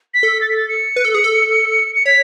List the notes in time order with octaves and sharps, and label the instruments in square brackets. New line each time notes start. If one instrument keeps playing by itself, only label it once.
[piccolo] B6
[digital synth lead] A4
[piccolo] A6
B6
A6
C#7
[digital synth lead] B4
A4
G#4
A4
[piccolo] C#7
[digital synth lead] C#5 [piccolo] B6